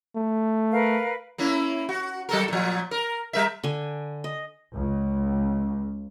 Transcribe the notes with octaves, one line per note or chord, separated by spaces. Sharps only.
A3
A#4 B4 F5
A#3 C#4 E4
F#4
F#3 A4 A#4
A#2 F3
A#4
G3 A#4 E5
D3 G#5
D#5
C#2